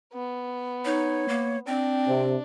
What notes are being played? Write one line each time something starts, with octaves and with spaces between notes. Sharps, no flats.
B3
D#4 C#5
A#3
C4 D4 G5
C3